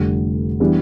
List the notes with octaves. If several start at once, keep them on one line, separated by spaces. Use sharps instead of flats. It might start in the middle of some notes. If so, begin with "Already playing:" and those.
Already playing: F1 F2 D3 G3
E3 G3 B3 D4